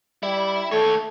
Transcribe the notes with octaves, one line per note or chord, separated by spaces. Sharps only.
G3 E4
D#2 A3 C#5